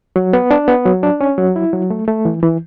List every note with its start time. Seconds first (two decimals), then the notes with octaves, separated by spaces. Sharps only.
0.16 F#3
0.33 B3
0.51 D4
0.68 B3
0.85 F#3
1.03 D4
1.21 C#4
1.38 F#3
1.56 E4
1.73 F#3
1.90 A3
2.08 A3
2.25 E3
2.43 E3